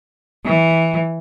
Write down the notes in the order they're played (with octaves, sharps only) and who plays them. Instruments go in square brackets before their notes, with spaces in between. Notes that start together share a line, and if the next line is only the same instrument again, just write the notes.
[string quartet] E3